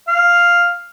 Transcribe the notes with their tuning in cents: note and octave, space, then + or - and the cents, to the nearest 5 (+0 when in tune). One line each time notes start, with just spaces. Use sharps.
F5 +0